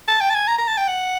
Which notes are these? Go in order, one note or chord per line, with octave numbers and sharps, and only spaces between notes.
A5
G5
A5
G#5
A#5
A#5
A5
G5
F#5